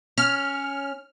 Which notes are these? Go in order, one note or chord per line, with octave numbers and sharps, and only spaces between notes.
C#4 F6